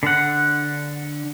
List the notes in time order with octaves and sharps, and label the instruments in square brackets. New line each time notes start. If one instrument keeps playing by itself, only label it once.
[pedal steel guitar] D3 F#5